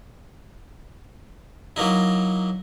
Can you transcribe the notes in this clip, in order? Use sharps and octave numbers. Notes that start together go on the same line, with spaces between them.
F#3 A#3 D#4 E4